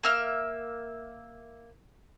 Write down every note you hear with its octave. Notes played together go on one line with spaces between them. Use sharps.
A#3 E5 F6